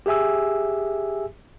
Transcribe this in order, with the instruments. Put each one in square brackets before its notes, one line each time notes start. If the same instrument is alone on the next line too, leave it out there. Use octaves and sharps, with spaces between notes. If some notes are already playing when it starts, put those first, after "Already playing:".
[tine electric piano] G4 G#4 E5 G#5 E6